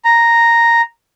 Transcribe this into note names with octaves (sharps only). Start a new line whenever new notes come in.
A#5